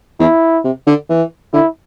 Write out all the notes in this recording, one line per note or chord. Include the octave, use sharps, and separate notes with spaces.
E2 E4
C3
D3
E3
D3 E4